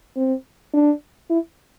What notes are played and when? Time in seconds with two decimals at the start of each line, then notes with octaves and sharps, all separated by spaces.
0.17 C4
0.74 D4
1.30 E4